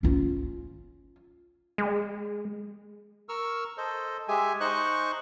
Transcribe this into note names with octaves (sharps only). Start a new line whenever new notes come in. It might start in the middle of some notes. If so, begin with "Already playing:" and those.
C#4 F4
G#3
A#4 C#6 E6 F6
A4 C5 D#5
G#3 G4 G#4 E5 G#5
D#4 C5 D#5 C#6 F#6